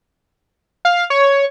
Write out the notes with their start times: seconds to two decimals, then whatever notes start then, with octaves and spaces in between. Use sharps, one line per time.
0.85 F5
1.10 C#5